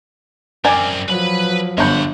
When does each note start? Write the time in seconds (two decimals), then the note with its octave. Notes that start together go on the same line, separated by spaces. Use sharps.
0.65 F#2 C4 A#4 D5 G#5
1.08 F3 F#3 B4 B5
1.78 G1 G2 C#5 F#5 A#5 B5 G6